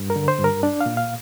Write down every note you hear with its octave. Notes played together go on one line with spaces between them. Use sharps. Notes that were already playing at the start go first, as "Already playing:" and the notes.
Already playing: G2
A#4
D3
C5
G2
A#4
D4 D5
F5
A#2
F5